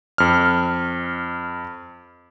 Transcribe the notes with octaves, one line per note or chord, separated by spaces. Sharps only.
F2 F6